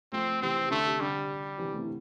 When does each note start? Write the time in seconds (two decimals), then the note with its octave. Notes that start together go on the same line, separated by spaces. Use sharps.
0.12 F3 A3 C4
0.42 C3 E3 C4
0.65 C3
0.71 D3 A3
0.86 C3
1.00 D3 G3
1.58 C3 E3
1.73 A3 C4
1.82 E4